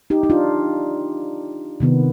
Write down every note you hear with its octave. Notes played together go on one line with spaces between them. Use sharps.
D#4 G4
D#4
D4 F4
C3 D#3 B3